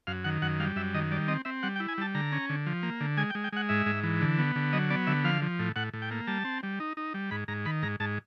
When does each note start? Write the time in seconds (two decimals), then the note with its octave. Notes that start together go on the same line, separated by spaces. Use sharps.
0.07 F#2 F5
0.24 D#3 F#5
0.42 F#2 F#5
0.60 G3 F5
0.76 F#2 E5
0.94 D#3 D#5
1.11 G3 D5
1.28 C4 D#5
1.45 C4 E5
1.63 G3 F#5
1.76 G5
1.80 E4
1.88 G#5
1.98 G3 A5
2.15 D3 A#5
2.32 C#4
2.49 D3
2.66 F3
2.83 A#3
3.00 D3
3.17 G#3 G#5
3.30 G5
3.35 G#3
3.44 G5
3.52 G#3 F#5
3.69 G#2 E5
3.86 G#2
4.03 E3
4.21 D3
4.38 B3
4.56 D3
4.73 F#3 D#5
4.90 B3 D5
5.07 D3 E5
5.24 F3 F5
5.42 F3
5.59 A2
5.76 A2 F#5
5.93 A2
6.02 G5
6.11 A#3
6.27 G3 A5
6.45 C4
6.63 G3
6.80 D#4
6.97 D#4
7.14 G3
7.31 G#2 B5
7.48 G#2 A#5
7.66 D#3 B5
7.83 G#2 A#5
8.00 G#2 A5